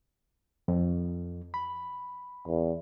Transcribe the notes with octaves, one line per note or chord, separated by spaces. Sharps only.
F2
B5
E2